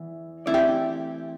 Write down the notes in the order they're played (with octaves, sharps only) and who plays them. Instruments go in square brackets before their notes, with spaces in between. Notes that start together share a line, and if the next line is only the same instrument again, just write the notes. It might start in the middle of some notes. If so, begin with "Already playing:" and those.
Already playing: [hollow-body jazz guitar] E2 E3
[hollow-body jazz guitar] E3 A3 C4 A4 D5 [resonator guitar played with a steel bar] E4
[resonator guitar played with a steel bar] G4